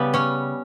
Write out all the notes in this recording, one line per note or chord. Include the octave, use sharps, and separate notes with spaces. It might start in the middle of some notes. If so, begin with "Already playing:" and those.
Already playing: C#3 G3 B3 B4
C#4 C#5